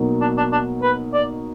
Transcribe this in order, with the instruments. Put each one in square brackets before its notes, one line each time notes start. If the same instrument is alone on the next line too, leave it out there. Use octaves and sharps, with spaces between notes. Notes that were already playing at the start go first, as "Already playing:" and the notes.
Already playing: [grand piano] B2 F#3 A#3 D#4
[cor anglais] D4
D4
D4
B4
D5